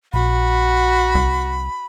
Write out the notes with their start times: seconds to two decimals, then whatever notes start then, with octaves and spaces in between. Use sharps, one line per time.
0.13 A#1 F#4 B5
1.15 C2